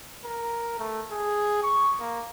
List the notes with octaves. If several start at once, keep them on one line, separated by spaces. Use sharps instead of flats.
A#4
A3
G#4
C#6
A#3